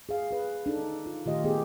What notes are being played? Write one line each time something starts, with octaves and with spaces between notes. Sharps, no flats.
G#4 F5
G#4 B4
D4 D#4 A4
F4
A#2 D#3 A3 F4 G4 D#5
B3 G4 G#4 D#5